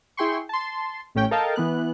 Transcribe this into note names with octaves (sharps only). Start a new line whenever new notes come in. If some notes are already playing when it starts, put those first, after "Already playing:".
E4 G#4 G5 C6 C#6
A5 C6
A1 A2 C#4 G5
A4 A#4 D#5 F5 G5 A5
E3 B3 F#6